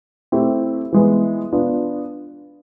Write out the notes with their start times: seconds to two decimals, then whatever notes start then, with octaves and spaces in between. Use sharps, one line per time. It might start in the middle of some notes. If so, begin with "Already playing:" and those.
0.32 A3 C4 E4 G4
0.92 E3 G#3 B3
1.52 B3 D4 F4